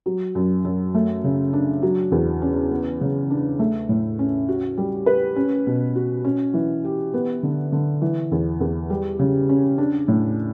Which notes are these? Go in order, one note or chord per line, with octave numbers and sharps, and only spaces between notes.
F#3
F#2
F#2
A3
C#3
D4
F#3
E2
C#4
B3
C#3
D4
A3
A2
C#4
F#4
G3
B4
C#4
B2
F#4
C#4
E3
G4
B3
D3
D3
E3
E2
E2
G3
C#3
C#4
D4
A2